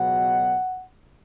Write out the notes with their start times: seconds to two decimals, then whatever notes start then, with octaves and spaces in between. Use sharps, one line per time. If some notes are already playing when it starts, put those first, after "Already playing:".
Already playing: C#2 B2 F#3 F#5